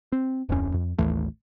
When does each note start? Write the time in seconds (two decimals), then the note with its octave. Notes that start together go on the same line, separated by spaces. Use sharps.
0.12 C4
0.49 D1 F2 F#3 C#4
0.74 F2
0.98 A1 D#2 E3 A3